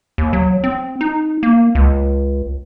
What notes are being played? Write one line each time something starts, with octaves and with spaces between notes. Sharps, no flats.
D#2
F#3
C4
D#4
A#3
C#2